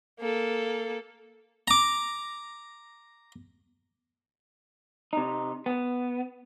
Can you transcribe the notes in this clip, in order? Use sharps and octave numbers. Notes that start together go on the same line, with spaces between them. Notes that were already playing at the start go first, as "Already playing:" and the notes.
A#3 A4
A#5 D6
C3 D#4
B3